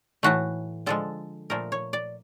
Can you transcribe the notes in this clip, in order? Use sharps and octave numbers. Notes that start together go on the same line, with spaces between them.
A2 E3 A3 F#4
D3 F3 G#3 A4
A#2 F3 A3 A#4
C#5
D5